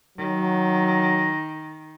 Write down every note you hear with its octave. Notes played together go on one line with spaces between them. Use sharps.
D#3 F#3